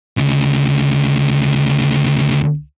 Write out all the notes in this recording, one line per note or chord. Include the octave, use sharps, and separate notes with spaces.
D2 C#3